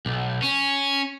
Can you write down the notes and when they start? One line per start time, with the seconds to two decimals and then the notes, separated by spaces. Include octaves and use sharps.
0.06 B1
0.42 C#4